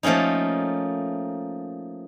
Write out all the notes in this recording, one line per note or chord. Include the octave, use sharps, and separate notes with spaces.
F3 A3 A#3 C#4 D#4